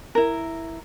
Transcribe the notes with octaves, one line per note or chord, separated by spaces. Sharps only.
E4 A#4